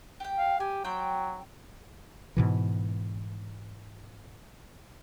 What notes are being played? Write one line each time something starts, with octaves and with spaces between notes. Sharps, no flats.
G4 G5
F5
G4 G#5
F#3 C4 G5
G#2 B2 E3